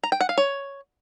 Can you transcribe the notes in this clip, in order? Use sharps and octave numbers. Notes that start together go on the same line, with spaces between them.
A#5
G5
F#5
F5
C#5